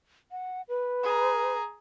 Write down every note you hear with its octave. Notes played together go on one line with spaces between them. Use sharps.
F#5
B4
G#4 A#5